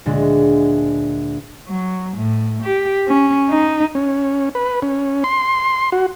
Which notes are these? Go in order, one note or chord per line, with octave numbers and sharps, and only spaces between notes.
D2 A#2 D3 G#3
F#3
A2
G4
C#4
D#4
C#4
B4
C#4
C6
F#4